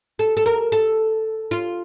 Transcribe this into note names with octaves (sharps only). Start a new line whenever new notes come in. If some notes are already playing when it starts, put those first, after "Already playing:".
A4
A4
A#4
A4
F4